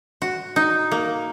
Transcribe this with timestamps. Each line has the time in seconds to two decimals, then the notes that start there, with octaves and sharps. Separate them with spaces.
0.22 F#4
0.56 D#4
0.91 A#3